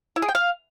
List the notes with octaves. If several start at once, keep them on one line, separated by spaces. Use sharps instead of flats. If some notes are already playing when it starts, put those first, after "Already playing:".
E4
G#4
G5
F5